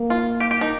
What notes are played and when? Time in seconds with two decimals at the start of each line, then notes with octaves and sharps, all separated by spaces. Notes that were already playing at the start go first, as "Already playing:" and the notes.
Already playing: A#3
0.10 F4
0.40 G4
0.51 G4
0.61 D#4